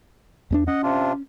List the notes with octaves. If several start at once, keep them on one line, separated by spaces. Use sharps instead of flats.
E2 A#3 D4
C#4 D#5 F#5
C3 D4 F4